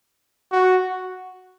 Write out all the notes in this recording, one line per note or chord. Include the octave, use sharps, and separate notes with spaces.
F#4